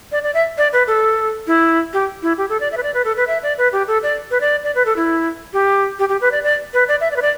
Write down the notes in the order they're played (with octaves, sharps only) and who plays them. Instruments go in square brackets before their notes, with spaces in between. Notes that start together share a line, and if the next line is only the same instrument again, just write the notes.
[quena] D5
D5
E5
D5
B4
A4
E4
G4
E4
G4
A4
D5
E5
B4
D5
B4
A4
B4
E5
D5
B4
G4
A4
D5
B4
D5
D5
B4
A4
E4
G4
G4
G4
B4
D5
D5
B4
D5
E5
D5
B4
D5